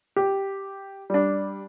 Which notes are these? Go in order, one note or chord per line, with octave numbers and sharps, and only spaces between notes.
G4
G3 D4